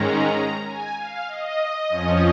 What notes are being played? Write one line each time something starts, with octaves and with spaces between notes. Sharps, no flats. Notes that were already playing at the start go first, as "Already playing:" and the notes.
Already playing: G#2 D#3 G#3 C#4 A#5
G#5
F5
D#5
F2 F3 C#4